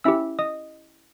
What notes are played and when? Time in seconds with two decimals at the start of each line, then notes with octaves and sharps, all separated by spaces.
0.04 C#4 E4 G4 E5 E6
0.39 D#5 D#6